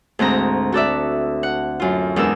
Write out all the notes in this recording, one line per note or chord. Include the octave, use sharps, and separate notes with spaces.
D2 G#2 C4 A#5
F#4 A4 D5 E5
F#5
F#2 F4
E2 G#2 D4 A#4 E6